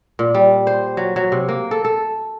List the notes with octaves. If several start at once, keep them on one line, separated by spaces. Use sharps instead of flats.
A#2
G3
C5
F#3
F#3
C3
A#3
A4
A4